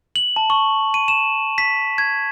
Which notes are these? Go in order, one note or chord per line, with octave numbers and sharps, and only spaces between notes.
F#7
A5
C#6
D#7
E7
B6
G#6